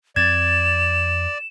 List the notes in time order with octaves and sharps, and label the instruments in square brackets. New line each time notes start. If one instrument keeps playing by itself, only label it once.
[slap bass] F2 C4 [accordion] D5 [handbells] G#6 A6 [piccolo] E7